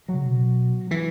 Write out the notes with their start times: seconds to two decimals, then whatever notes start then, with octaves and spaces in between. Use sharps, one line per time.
0.08 F#3
0.14 C#3
0.25 B2
0.91 E3